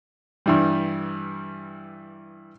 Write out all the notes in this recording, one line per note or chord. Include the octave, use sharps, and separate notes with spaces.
G2 E3 G3